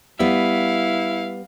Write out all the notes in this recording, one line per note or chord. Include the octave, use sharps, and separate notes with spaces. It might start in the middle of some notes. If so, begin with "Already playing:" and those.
G3 B3 E4 F5